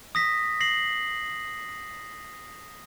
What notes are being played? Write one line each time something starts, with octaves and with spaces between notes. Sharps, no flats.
D#6 A#6 B6
A#6 C7 F#7